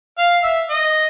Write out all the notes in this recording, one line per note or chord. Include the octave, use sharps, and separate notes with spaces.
F5
E5
D#5